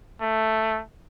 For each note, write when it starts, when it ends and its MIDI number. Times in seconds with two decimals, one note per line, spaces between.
0.21 0.81 57